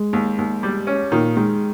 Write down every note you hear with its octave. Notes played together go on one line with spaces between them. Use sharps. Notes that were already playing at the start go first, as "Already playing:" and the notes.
Already playing: G#3
D#2
D#2
G3
C#4
A#2 D#3 A#3
D#3 G#3